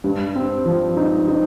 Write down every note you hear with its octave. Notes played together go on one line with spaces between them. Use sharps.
G2
C4
F3
D#4
D#4